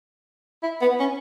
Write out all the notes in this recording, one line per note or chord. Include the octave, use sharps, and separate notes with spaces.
E4
B3
C#4